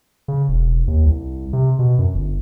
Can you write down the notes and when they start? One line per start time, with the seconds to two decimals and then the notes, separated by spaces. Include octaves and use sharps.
0.28 C#3
0.48 E1
0.87 D#2
1.05 C2
1.53 C3
1.79 B2
1.99 F#2
2.14 G1